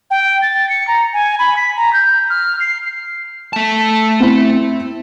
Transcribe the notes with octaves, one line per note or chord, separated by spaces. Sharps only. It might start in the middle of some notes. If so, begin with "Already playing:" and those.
G5
A6
C#7
A#5
G#5
B5
B6
A#5
G6
F6
C7
A3 A5
C4 E4